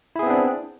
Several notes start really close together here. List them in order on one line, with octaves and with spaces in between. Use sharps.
E4 G#4 B3 C4 D4